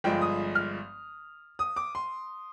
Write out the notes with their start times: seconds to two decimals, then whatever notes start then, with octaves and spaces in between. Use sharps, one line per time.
0.04 G1 G2 F3 G#3 G5
0.21 D#6
0.55 F6
1.59 D#6
1.76 D6
1.95 C6